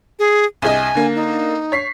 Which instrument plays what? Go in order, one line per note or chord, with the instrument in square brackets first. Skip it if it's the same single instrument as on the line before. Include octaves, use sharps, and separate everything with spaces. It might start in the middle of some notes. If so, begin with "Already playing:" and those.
[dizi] G#4
[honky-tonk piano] C2 G#4 D#5 [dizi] G#5
[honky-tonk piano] D3 A#3
[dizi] D#4
[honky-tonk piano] C#5 B6 C7